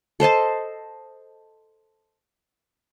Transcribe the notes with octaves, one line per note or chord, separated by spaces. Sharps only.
A4 C5 D#5 A5